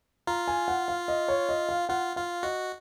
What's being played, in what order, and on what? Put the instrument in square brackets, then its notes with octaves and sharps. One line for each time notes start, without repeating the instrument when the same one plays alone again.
[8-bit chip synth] F4 [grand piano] A#5
[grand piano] G#5
F#5
F5
D#5
C#5
D#5
F5
[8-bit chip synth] F4 [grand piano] F#5
[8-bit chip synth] F4 [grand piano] F5
[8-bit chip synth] F#4 [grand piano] D#5